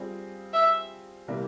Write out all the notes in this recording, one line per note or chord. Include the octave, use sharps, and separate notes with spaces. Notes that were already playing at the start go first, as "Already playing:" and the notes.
Already playing: G3 C4 F4 G#4
E5
C3 E3 G3 A#3